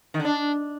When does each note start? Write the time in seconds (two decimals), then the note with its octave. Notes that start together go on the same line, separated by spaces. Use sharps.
0.14 D#3
0.19 D3
0.25 D4